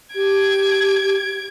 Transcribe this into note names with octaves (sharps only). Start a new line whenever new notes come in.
G4 G#6 D7